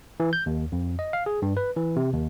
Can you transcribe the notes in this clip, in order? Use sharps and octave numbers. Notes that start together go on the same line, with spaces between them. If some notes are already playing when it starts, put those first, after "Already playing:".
E3
G6
D#2
F2
D#5
F5
G#4
G2
B4
E3
C3
D#2